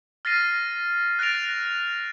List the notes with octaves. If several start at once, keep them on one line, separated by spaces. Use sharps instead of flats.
F6 A6 A#6 C7 D#7
F#6 A6 A#6 D7 F7